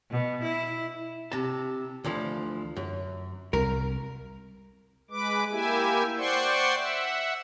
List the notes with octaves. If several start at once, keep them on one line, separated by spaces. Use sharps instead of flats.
B2
E4
C3 A5
D2 E3 F3
F#2
C2 A#4
G#3 B4 D6
A#3 E4 G4 E5 G#5
C5 D5 F#5 G5 C6 C#6
E5 F#5